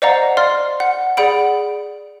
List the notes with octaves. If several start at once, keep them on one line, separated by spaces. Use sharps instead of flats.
C5 D5 D#5 F5 F#5 A#5
D5 F5 C6 F6
F#5
G#4 D5 F#5 B5 D7